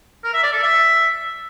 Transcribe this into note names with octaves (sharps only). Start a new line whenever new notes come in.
A#4
E5
D5
A4
E5